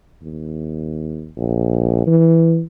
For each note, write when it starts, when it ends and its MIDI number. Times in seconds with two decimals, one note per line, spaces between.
0.22 1.29 39
1.37 2.02 34
2.07 2.62 52